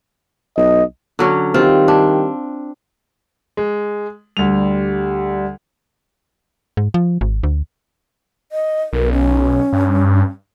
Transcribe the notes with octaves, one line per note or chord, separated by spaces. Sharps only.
B1 D#5
D3 F#3 C#4
D#3 G3 C4 F4 G4
D4
G#3
D2 G3 F7
G#2
F3
G#1
D2
D#5
B1 A#4
C#4
G2